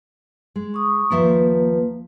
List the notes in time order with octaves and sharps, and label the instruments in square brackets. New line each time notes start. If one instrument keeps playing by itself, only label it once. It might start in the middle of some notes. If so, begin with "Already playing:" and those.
[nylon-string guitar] G#3
[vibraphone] C#6 D#6
[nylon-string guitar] D#2 F3 E5 [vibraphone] A#3 B4